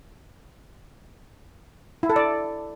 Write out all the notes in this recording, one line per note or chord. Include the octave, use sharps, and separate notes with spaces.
E4
A4
D5